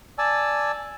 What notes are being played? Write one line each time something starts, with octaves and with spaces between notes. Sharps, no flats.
D5 G#5 A5 E6